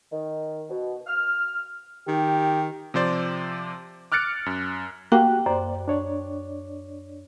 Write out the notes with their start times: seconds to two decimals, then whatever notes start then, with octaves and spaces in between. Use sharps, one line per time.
0.12 D#3
0.70 B2
1.06 F6
2.08 D#3 G4
2.94 C3 F3 C5 D5
4.12 D6 F6 F#6 A6 C#7 D7
4.46 F#2
5.12 A#3 F#4 G4 G5 F#6
5.46 F#2 C5 D5
5.88 D4 C#5 D5